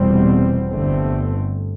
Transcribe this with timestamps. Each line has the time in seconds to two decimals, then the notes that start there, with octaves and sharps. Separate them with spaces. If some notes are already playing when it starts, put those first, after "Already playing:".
Already playing: F1 E2 B2 G3 C4
0.71 G1 G2 D3 A3 C4